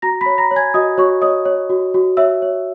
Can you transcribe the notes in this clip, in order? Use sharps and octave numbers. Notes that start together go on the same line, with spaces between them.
F#4 A#5 A#6
B5 B6
C#5
A#5 A#6
C#5
G#5 G#6
F#4 D#5 D#6
F#4 C#5 C#6
C#5 D#5 D#6
C#5
F#4
F#4
C#5 E5 E6
C#5